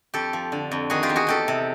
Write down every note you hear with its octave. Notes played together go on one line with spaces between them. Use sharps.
F2 G4 A4
F3
D3
F2
D#3 F#4 G#4
F4 G4
E2
F#4 G#4
E2 G4 A4
C3